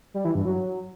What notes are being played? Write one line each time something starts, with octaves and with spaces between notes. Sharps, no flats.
G3
E3
G2
F#3